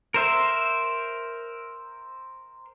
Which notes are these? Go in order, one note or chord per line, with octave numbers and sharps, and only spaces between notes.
A#4 C5 E5